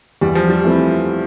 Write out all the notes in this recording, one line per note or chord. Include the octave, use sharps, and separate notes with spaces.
E2 G3
F3
G3
E3 A3 C4 E4